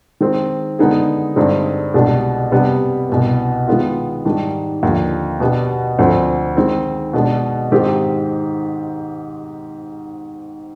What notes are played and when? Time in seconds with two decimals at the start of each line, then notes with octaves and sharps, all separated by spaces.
0.21 D#3 G#3 C4
0.79 D3 G#3 B3 D#4 G#4
1.36 G2 D3 G#3 C4 D#4
1.94 C2 B2 G#3 D4 G4
2.52 C3 G3 B3 D4
3.09 C2 B2 B3
3.67 D#3 G#3 B3 F4
4.25 G#2 D#3 G3 D4
4.83 D#2 D3 F3
5.40 B2 B3 D4 G4
5.99 D2 D3 F3 C4
6.57 D#3 G#3 C4
7.13 B2 G#3 D4
7.72 G#2 D#3 G#3 C4 G4